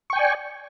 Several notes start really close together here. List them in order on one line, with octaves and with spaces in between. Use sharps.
C#6 G5 G#5 D5